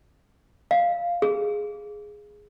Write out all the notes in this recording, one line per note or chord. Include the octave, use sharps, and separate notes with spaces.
F5
G#4